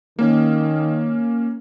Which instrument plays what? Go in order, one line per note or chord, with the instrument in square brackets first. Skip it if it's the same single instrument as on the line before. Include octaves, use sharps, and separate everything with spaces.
[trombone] D#3 [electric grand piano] A#3 C#4